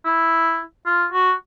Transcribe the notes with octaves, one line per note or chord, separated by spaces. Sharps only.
E4
F4
F#4